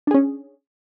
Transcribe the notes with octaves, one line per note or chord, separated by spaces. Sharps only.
C#4 D4 G#4